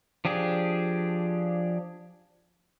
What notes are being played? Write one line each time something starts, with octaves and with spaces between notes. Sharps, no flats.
F3 D4 G4 G#4